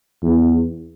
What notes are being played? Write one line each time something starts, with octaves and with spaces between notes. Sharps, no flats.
E2